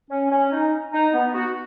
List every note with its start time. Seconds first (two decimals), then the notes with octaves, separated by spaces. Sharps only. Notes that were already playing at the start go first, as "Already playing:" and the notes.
0.10 C#4
0.31 C#4
0.52 D#4
0.93 D#4
1.13 B3
1.34 F#4